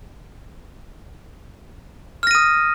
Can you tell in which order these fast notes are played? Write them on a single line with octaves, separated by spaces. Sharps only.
F6 A#6 D#7 D#6